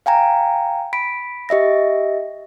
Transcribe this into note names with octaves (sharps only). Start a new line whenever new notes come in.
F5 G5 G#5 A#5
B5 B6 D7
G4 D#5 E5 A#6